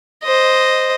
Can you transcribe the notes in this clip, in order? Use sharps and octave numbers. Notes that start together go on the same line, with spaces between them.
C5 D#5